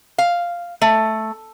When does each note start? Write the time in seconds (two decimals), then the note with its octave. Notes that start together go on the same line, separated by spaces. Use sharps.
0.18 F5
0.82 A3